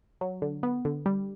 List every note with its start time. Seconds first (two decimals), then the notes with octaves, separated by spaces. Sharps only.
0.21 F#3
0.42 D3
0.63 B3
0.85 D3
1.06 G3